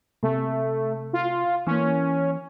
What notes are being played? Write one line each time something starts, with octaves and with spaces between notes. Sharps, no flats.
C3 A3
F4
E3 A#3 C#4